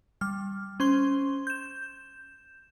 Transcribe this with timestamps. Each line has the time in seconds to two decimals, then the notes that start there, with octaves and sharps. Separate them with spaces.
0.21 G3 F6
0.80 C#4 C5 C6 G7
1.47 G6 E7